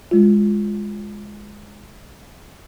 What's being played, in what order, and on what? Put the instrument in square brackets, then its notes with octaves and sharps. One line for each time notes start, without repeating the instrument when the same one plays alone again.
[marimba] G#3 F4